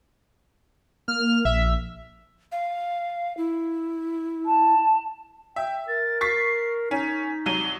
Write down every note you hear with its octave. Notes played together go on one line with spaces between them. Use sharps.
A#3 F6
A#1 E5
F5
E4
A5
E5 G5
A#4 A6
C#6 A6 B6 C7
C#4 D#4 B6
C2 F#3 D#7 G7